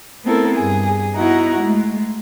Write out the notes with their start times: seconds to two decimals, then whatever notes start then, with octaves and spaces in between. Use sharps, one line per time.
0.24 A3 B3 C4 E4 A4 A#4
0.56 G2 G#4
1.15 B3 D#4 E4 F#4 F#5 A#5
1.59 G#3 A3